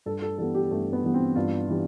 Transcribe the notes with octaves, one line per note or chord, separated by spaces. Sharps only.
G2 A4
A4
E3 G3 B3 A4
G4
G2 A3
B3
E3 G3 B3
C4
G2 F4
E3 G3